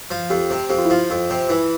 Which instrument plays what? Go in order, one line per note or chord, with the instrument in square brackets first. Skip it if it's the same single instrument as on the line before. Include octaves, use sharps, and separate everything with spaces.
[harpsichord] F3
[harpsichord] F2 [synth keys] G4
[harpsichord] C3
[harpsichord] F2 [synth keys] G4
[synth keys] F4
E4
[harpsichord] F3 [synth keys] F4
[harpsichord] F2 [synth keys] F4
[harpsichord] C3
[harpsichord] E3 [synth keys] E4